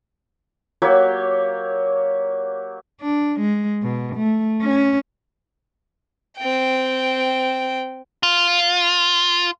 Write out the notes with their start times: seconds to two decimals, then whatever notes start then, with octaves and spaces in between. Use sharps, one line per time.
0.82 F#3 A#3 G4 C#5
3.01 D4
3.40 G#3
3.83 B2
4.16 A3
4.63 C#4
6.38 C4 G5
8.23 F4